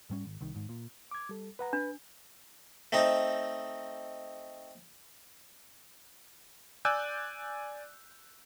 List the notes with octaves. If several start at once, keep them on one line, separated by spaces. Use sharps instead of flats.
G#2 G3 C#4
G#1
C2 D#3
G#1 G#2
A#2
D6 G#6
G3 A4
B4 F#5 A#5
D4 B4
A3 C4 D#4
D5 G#5 D6 E6 F#6 G6